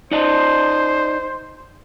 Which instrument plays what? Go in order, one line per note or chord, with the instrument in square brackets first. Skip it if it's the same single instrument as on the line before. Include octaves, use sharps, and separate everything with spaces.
[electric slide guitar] D#4 D5 D#5 [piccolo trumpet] C5